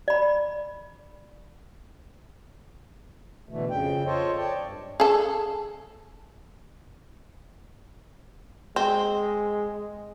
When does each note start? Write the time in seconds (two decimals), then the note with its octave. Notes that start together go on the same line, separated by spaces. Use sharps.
0.08 D5 B5
3.49 B2 D3 E3 A3
3.70 F2 C#3 G5
4.06 F4 A4 C5 C#5 D#5
4.38 C#5 D5 G5 A5
4.62 G2
5.00 G#4 A4
8.76 G#3 C4